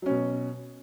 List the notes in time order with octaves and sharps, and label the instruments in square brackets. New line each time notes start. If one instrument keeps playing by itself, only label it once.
[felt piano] F#3
C#4
B2